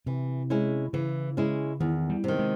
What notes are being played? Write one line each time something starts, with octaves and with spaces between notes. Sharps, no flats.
C3 E3
G#3 C#4 E4
C#3 E3
G#3 C#4 E4
E2 D#3
G3
C3 D#3
G#3